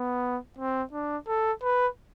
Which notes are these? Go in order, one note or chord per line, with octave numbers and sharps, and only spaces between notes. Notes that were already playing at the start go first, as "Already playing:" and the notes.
Already playing: B3
C4
D4
A4
B4